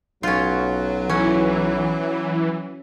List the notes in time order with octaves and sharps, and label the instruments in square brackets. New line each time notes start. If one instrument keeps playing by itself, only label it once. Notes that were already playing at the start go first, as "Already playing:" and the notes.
[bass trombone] B1 [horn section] F#3 [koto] C#4 F4
[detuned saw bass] E3 [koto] C#4